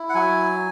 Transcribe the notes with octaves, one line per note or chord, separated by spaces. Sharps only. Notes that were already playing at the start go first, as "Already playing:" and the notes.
Already playing: E4
F#5
F#3 G#5